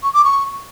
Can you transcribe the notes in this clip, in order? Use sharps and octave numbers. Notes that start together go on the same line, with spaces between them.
C#6
D6
C#6